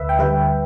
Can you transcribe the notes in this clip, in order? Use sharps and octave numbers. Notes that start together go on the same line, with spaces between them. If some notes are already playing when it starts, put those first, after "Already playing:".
Already playing: D2 B4 E5
G5
D3 G3 B4 E5